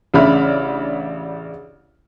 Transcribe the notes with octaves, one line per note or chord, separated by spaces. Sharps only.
A1 C#3 D4 E5 B5 F6